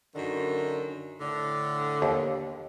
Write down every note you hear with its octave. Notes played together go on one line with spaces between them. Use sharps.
F#2 D3 D#3
A2 D3
D#2